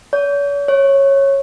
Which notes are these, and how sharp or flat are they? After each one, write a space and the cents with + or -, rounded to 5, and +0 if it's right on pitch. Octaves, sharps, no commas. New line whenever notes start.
C#5 +45
C#5 -10